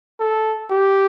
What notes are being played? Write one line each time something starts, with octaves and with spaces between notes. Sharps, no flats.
A4
G4